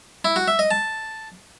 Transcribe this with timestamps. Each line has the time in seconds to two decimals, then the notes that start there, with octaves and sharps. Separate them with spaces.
0.25 E4
0.36 F#4
0.48 E5
0.59 D#5
0.71 A5